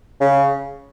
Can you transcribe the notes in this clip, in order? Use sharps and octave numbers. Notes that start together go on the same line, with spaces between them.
C#3